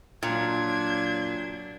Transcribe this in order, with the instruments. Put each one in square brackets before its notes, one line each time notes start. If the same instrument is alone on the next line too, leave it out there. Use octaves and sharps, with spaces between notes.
[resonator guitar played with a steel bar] A#2 [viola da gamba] F#3 D4 [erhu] G#6